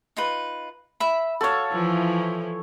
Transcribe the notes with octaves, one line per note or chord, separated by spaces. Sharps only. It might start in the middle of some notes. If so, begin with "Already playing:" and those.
D#4 F4 B4
E5 B5
F#4 A4 C#5 F5
E3 F3 E4